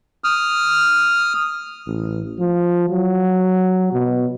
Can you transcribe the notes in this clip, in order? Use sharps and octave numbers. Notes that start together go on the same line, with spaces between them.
D#6 F6
A1
F3
F#3
B2